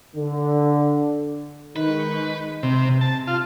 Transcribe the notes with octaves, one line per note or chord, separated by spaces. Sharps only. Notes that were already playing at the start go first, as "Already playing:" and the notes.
D3
D#3 G#3 D#4 B4 C#6 G6
C3
A5
F4